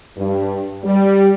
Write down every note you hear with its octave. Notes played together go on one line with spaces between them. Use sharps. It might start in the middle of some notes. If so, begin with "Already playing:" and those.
G2
G3